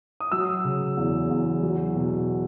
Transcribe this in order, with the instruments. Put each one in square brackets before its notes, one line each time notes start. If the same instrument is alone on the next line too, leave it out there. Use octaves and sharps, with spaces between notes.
[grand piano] D#6
F#3 E6
C#3
E2
E2
F#3
B2